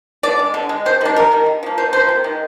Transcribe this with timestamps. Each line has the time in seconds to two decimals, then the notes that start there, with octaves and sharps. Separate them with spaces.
0.23 D3 D5
0.39 G#3
0.54 D3
0.69 G#3
0.86 C3 C5
1.01 D#3 G3 D4
1.16 C3 A#4
1.31 D#3 G3
1.46 D3
1.63 F3 A#3
1.78 D3 C5
1.93 F3 A#3 C5
2.09 C3
2.24 D#3 G#3